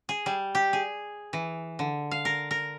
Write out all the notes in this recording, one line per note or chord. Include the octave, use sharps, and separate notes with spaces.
G#4
G3
G4
G#4
E3
D3
F5
A#4
A#4